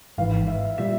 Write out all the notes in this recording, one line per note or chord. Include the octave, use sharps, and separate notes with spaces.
G#1 G#2 E3 F5
E5
A#2 G3 E5